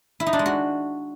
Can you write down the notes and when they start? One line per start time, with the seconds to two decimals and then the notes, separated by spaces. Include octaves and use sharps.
0.20 E4
0.26 D#4
0.33 D4
0.39 G#3
0.46 F#4